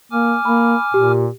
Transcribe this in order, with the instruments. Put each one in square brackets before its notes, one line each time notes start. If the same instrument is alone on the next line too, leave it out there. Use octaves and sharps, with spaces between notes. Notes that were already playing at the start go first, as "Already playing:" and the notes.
[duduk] A#3 [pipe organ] G#5 D6 F6
[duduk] A#3 [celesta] B5
[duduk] A#2 [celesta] G4